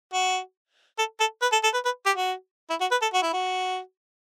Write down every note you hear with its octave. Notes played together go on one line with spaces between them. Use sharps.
F#4
A4
A4
B4
A4
A4
B4
B4
G4
F#4
E4
F#4
B4
A4
F#4
E4
F#4